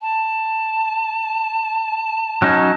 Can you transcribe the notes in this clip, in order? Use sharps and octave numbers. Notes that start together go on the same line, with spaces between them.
A5
F#3 C#4 D#4